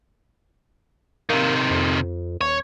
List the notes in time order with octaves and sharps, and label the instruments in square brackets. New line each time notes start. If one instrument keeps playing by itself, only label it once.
[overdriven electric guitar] C3 D#3 [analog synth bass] A#3
[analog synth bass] F2
[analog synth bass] D#1 [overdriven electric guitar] C#5